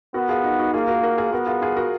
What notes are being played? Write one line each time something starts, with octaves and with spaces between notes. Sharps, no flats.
B3 F#4 A#4
F4 G#4
D#4 F#4
D#4 F#4
A#3 F4 G#4
F#4 A#4
F#4 A#4
F4 G#4
B3 F#4 A#4
F4 G#4
F4 G#4
F#4 A#4